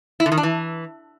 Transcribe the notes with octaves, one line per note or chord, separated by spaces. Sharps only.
E4
D3
D#3
D4
E3